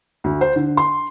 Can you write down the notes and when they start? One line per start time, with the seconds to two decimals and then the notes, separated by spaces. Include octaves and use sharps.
0.24 D2
0.41 C5
0.56 D3
0.77 C6